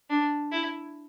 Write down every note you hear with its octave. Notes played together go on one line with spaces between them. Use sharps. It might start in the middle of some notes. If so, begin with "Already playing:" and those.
D4
E4